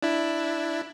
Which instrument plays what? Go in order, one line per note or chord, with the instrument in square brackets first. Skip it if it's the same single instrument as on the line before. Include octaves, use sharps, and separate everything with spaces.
[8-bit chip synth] D4 E4